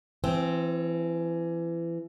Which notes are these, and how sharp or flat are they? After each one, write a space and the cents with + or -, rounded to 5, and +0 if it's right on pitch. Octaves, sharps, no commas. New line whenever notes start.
E3 +30 C4 +0